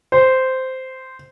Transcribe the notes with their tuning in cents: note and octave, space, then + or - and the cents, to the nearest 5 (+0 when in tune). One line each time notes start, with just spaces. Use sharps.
C5 -10